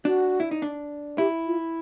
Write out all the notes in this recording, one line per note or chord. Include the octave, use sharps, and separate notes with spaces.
D4 F#4
E4
D#4
D4
E4 G4
F4